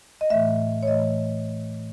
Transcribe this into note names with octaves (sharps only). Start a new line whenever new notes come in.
D#5
A2 E3 A3 E5
C#5
A2 E3 A3 D#5